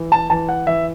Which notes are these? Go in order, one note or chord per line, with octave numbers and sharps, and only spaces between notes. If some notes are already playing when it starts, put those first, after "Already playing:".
Already playing: E3
A5
E3 A5
F#5
E3 E5